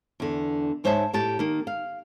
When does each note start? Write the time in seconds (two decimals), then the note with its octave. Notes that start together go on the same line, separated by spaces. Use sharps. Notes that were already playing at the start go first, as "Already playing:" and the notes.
0.20 E2 D3
0.84 G#2 G#3 C5 C#5 E5 A5
1.13 A2 G4 A5
1.39 D#3 A#3
1.67 F5